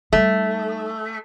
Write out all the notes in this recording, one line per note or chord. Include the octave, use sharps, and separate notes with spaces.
G3 A3 D#4